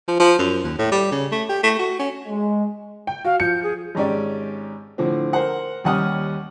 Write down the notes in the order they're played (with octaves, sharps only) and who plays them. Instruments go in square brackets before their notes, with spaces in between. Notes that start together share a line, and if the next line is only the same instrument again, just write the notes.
[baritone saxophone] F3
F3
F#2
D#2
A2
G3
C#3
A3
G4
A3
F#4
C#4
[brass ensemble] G#3
[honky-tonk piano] G5
[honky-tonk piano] F#4 [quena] F5
[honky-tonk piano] F3 C#7 [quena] G6
[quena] G#4
[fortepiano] G#1 G#2 C#4 G4 D5
A2 D3 F3 C4
A#4 C5 F#5
D#2 G3 C#4 F#5 D#6 F6